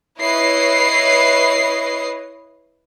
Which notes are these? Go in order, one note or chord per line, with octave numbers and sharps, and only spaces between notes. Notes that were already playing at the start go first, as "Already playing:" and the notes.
E4 B4 C#5 D#5 C7